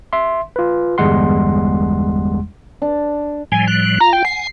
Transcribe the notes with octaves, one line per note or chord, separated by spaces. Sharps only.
E5 C6
F4 B4
G1 E2 G3 G#3 F#5 C6
D4
A2 F3 G3 G#5
F#6
F4 F5 A#5
G5
F#5 G#5 C7